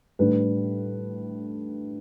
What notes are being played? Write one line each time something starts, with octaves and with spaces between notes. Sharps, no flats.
A2 G3 D4 B4